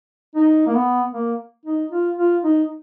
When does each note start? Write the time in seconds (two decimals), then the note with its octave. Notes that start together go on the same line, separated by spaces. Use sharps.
0.35 D#4
0.67 A#3
0.74 B3
1.13 A#3
1.66 D#4
1.91 F4
2.18 F4
2.44 D#4